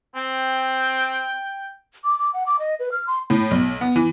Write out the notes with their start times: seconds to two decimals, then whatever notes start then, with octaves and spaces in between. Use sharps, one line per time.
0.16 C4 G5
2.04 D6
2.19 D6
2.34 F#5
2.47 D6
2.59 D#5
2.80 B4
2.92 F6
3.07 C6
3.30 A2
3.51 B1
3.81 B3
3.96 E3